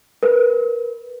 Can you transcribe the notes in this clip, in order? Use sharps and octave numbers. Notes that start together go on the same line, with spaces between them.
A#4 B4